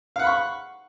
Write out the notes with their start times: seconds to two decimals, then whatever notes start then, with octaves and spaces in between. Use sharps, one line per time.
0.16 F5
0.19 F#5
0.23 B5
0.27 C#6